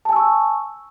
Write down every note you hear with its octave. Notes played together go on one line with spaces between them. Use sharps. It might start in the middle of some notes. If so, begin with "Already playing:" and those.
G#5 A5 C#6 E6